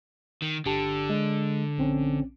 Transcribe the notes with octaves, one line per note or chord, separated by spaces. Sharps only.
D#3
G1 D3 G4 A5
G#3
A#1 C4 C#4